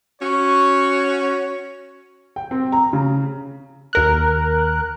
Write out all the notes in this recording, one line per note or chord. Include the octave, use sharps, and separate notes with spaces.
C#4 F#4 C#5
G5
C4
A#5
C#3
D#2 A#4 F#6